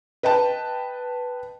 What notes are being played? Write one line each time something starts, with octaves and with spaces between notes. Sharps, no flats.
B4 D#5 G5 A5